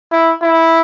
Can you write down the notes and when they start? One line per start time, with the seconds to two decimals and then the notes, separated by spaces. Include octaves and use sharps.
0.12 E4
0.42 E4